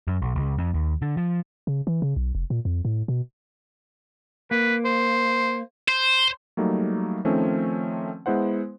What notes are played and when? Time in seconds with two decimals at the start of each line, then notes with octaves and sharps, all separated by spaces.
0.08 F#2
0.22 B1
0.36 C#2
0.58 F2
0.74 D#2
1.02 D3
1.17 F3
1.67 C#3
1.87 E3
2.02 C#3
2.16 B1
2.35 F1
2.50 A#2
2.65 F2
2.85 A2
3.08 B2
4.51 A#3 B4
4.85 C5
5.89 C5
6.57 F#3 G3 A3 A#3 D#4
7.25 D#3 F3 A3 C4 C#4 D#4
8.26 G#3 B3 E4 C5 F#5